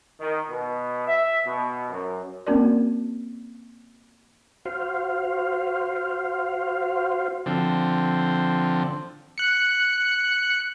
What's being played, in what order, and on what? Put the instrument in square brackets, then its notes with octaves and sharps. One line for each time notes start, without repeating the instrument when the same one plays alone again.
[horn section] D#3
B2
E5
B2
F#2
[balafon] A#3 C4 C#4 F#4 A#4 D5
[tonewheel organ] F#4 C5 F5
[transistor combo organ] D3 F3 C4
[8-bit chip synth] F#6 C#7